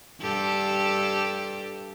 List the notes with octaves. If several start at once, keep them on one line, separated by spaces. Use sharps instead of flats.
G2 G4 A4